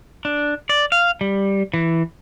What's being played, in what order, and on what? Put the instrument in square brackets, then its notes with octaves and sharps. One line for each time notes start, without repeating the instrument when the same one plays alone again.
[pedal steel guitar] D4
D5
F5
G3
E3